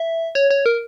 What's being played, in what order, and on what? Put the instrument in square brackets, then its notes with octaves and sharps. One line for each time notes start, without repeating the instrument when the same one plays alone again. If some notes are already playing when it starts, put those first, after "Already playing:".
Already playing: [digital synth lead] E5
C#5
C#5
A#4